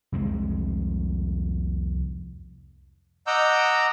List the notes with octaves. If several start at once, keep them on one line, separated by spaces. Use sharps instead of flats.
C2 F2 F3 G#3
D#5 F#5 A#5 D6 E6 G6